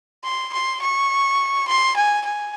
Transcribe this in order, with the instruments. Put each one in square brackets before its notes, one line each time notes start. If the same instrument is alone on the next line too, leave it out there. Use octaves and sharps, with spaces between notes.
[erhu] C6
C6
C#6
C6
G#5
G#5